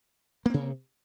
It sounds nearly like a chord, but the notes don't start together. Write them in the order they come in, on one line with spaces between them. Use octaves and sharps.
A#3 C4 C3